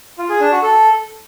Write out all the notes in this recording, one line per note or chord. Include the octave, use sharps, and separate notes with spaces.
F4
G#4
D4
F#4
A4